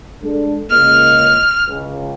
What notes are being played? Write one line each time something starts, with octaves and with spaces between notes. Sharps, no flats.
G#3 D4 A4
C#2 A#3 D#5 F6
C#2